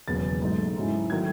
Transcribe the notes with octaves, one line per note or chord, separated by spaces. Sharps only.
E1 D#2 C#3 F#3 B3 A6
G#2 F#3 A3 D#4
G#2 F#3 C#4 E4
D#3 F#3 A3 G#6